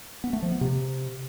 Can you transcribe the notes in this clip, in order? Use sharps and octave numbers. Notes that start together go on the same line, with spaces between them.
B3
A3
F3
B3
C3